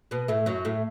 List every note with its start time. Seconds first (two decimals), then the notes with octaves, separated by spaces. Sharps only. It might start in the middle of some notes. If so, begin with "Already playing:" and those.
0.11 B2 B3
0.28 A2 A3
0.46 F#2 F#3
0.65 A2 A3